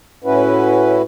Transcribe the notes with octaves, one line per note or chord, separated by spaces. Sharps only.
A2 C#4 E4 F#4 B4